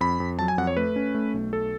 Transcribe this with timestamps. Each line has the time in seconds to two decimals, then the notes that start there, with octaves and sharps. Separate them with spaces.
0.01 F2 B5
0.20 F2
0.39 F#3 A5
0.48 G#5
0.58 F2 F#5
0.67 C#5
0.77 A3 B4
0.96 C#4
1.14 A3
1.34 B1
1.52 A3 A4